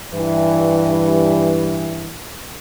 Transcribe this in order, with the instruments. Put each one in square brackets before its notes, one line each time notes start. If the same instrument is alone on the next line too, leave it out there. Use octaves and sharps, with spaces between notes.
[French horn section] G2 E3